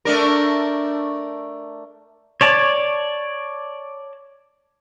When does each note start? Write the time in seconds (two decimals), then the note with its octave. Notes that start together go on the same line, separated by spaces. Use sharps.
0.05 A3 D4 A#4
2.41 C#5 D5 A5